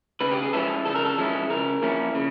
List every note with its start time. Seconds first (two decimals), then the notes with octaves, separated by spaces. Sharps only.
0.20 C#3 B4
0.32 G4
0.42 G#4
0.53 F3 G#3 C#4 E4 A4
0.85 C#3 A4
0.95 A#4
1.05 A4
1.18 F3 G#3 C#4 E4 A4
1.50 C#3 A#4
1.82 F3 A#3 C#4 E4
2.15 C#3